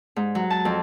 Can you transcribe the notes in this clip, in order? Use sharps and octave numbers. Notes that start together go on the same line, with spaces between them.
G#2
F#3
A5
F2